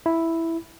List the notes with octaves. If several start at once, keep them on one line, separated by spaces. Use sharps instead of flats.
E4